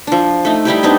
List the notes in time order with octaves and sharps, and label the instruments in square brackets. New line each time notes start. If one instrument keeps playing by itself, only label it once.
[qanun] F3 D4
A3 D#4
G3 D#4 E4 G4
B3 C4 D4 D#4